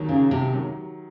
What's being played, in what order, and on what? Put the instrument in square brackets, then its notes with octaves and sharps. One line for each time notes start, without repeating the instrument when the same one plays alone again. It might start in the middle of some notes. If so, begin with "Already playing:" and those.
Already playing: [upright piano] D#2 D#3 F#3
[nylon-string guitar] C#3
C3
[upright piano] D#3 F#3